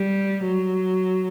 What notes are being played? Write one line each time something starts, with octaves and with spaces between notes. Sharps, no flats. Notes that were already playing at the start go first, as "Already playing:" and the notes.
Already playing: G3
F#3